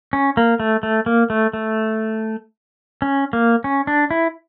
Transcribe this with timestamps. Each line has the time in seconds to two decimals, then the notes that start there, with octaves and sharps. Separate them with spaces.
0.13 C#4
0.37 A#3
0.60 A3
0.83 A3
1.06 A#3
1.30 A3
1.53 A3
3.02 C#4
3.33 A#3
3.64 C#4
3.87 D4
4.11 E4